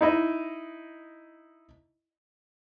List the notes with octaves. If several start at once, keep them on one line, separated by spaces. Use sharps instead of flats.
D#4 E4 D#5